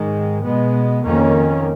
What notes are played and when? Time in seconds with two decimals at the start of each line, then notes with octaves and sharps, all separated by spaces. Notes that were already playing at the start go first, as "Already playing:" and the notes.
Already playing: G#2 D#3 G#3
0.44 B2 G#3 B3
1.03 F2 D#3 A#3 C#4